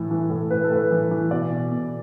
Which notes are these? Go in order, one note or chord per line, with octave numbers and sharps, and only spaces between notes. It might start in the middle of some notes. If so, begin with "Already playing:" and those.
Already playing: A2 E3 A4
E3
A2
A2 B4
A4
A2 B4
E3
E3
B2 D5
B2
B2